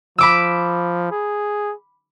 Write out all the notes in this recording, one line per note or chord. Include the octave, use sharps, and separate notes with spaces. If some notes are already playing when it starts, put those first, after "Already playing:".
F3 B5 D6 E6
G#4